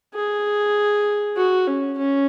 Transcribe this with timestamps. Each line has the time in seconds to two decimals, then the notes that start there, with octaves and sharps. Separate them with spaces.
0.14 G#4
1.36 F#4
1.67 C#4
1.98 C#4